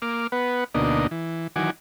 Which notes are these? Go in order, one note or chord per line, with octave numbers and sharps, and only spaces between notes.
A#3 D6 F6
B3 B4 F#5
D2 B2 A#3 D4 D#4 D#5
E3
D#3 E3 F#3 F#5 G#5 D6